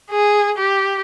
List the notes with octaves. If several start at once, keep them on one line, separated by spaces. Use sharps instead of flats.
G#4
G4